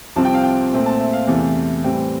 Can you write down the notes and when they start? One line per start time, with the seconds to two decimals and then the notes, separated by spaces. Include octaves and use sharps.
0.16 C2 C3 F3 C4 A5
0.25 G5
0.35 F5
0.43 G5
0.72 A#2 A3 C4
0.86 A5
1.01 E5
1.13 F5
1.27 E2 C3 E3 A3
1.84 A2 E3 G3 C4 G5